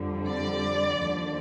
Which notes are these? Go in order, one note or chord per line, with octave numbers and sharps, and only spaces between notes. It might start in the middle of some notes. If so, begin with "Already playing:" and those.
Already playing: F2 D3 G3
D5
D#2 D3 F3